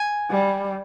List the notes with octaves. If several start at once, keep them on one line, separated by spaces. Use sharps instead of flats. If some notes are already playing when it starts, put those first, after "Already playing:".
Already playing: G#5
G3